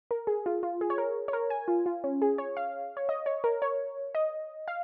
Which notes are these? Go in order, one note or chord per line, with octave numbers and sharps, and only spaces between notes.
A#4
G#4
F4
F4
G#4
C#5
A#4
C#5
A#4
G#5
F4
F4
C#4
G#4
C#5
F5
C#5
D#5
C#5
A#4
C#5
D#5
F5